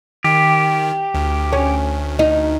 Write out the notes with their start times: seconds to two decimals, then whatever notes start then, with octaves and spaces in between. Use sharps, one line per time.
0.24 D#3 G4
1.14 D2
1.53 C#4
2.19 D#4